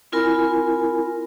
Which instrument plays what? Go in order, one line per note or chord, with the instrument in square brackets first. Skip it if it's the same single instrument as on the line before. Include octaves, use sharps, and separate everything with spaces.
[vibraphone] C4 E4 F4 A#4 G#5 B5